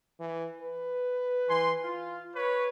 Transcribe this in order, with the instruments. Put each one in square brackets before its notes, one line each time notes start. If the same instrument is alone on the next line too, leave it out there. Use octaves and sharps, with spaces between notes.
[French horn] E3
B4
[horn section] E3 G#5 C6
F4
B4 C#5